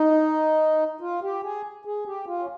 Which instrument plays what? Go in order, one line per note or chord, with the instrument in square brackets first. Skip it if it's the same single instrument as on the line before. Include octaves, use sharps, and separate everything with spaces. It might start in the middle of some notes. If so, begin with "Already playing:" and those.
Already playing: [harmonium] D#4
F4
G4
G#4
G#4
G4
F4
C#4